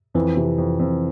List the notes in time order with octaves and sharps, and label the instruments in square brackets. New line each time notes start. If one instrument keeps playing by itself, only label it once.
[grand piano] F2 [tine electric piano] E3
[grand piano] C3
F2
F2